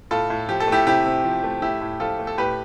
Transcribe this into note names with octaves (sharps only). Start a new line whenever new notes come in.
A2 F4 A4
A2
F3 G4
A4
A3 E4 G4
C3 E4 G4
C3
F3
A3
A2 E4 G4
A2
F3 F4 A4
A3
A4
A2 G4 B4